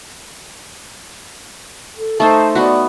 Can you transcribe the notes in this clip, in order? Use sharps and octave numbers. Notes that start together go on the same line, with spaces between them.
A4
A3 D#4 C5 A5
B3 F#4 D5